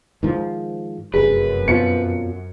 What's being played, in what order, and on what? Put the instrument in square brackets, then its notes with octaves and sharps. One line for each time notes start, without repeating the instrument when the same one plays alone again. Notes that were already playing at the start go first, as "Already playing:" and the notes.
[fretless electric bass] G#2 D#3 F3
[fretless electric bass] F1 [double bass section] F#2 [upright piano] G#4 [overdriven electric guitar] B4
[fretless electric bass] F2 B2 F3 [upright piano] C#7